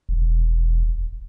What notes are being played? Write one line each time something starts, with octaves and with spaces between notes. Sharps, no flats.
E1